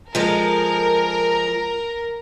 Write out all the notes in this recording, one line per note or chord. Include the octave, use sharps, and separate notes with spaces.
F3 G#3 A4 A#4